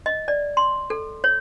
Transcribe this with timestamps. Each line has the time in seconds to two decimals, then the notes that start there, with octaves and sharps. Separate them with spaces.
0.06 D#5
0.28 D5
0.57 C6
0.90 A4
1.24 C#5